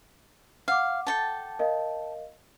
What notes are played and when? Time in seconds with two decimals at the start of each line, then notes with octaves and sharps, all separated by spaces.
0.68 F5 F#5 D6
1.07 A4 G5 A5
1.59 A#4 D#5 F5